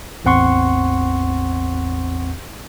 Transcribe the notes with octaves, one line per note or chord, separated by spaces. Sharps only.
A1 E2 C4 F#5 C6 C#6